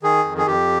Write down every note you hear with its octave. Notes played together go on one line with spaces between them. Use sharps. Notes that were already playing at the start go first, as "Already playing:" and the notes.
D#3 G#4
F2
G#4
F2 G4